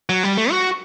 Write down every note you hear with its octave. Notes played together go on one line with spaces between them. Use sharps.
F#3
G3
A3
F#4